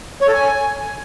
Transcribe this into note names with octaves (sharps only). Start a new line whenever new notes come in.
C#5
A4
G#5